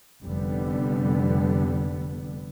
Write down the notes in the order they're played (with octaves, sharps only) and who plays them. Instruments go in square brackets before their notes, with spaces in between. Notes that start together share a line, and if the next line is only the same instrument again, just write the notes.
[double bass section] F1 D3 G3 B3